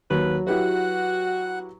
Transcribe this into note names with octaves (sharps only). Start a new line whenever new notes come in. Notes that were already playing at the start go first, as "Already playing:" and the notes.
D#2 F#3 B4
E4 F#4 G4 B4 F#5